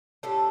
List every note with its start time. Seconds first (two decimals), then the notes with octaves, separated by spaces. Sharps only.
0.23 A2 G3 D4 A4